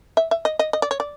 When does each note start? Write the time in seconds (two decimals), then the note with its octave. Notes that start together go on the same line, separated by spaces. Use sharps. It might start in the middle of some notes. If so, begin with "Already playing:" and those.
0.17 E5
0.31 E5
0.45 D#5
0.59 D#5
0.73 D#5
0.82 D5
0.91 C#5
1.00 D5